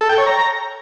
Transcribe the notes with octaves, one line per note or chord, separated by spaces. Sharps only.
A4
G5
C#5
A#5